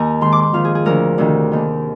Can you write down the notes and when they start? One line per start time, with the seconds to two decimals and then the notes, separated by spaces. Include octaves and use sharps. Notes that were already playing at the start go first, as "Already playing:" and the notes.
Already playing: D#2 G#5 A#5
0.21 G#2 D#3 C6
0.32 D6
0.43 D6
0.53 F2 D#3 F5
0.65 G#4
0.75 G#4
0.85 D2 D3 F3 A#4
1.18 D2 C3 D#3
1.51 D#2 D#3